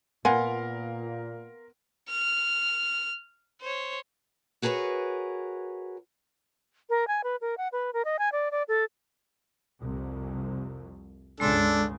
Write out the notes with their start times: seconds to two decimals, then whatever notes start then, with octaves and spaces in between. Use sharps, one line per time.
0.25 A#2 B3 A#4 F5 F#5 G#5 C6
2.09 F6
3.61 C5 C#5
4.62 F#4 G#4 A#4 B4 C#5
6.90 A#4
7.08 G#5
7.24 B4
7.41 A#4
7.58 F#5
7.72 B4
7.94 A#4
8.05 D#5
8.19 G#5
8.32 D5
8.51 D5
8.68 A4
9.80 C2 F2
11.40 G1 C#2 C#3 G#3 D4 A4 C6